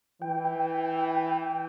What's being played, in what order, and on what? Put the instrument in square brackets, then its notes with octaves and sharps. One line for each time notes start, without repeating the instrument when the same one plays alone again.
[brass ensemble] E3 [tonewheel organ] G5